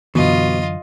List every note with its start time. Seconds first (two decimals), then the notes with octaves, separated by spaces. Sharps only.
0.15 F#2 B2 D3 E3 F4 D#5